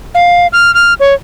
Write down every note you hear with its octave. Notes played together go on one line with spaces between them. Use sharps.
F5
F6
F6
C#5